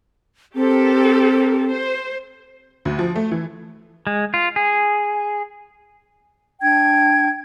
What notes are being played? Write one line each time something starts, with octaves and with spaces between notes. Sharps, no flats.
C4 G4 A4 A#4
C5
D2
F3
A3
E3
G#3
F4
G#4
D4 G5 G#6